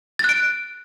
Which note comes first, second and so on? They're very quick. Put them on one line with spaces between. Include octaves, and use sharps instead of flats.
A6 F#6 D7